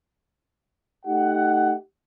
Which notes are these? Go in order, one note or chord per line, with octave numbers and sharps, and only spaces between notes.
A3 D#4 G4 F#5